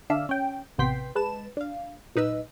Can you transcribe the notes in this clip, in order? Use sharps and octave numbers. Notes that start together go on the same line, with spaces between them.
D3 D4 D5 E5 F5 E6
C#4 G5
A1 C3 B3 G5 C6 B6
G#3 B4 A5 E7
D4 F5
B1 A#2 D#4 B4 D#5 E6